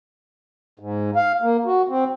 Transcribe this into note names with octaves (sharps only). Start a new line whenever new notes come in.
G#2
F5
A#3
F#4
C4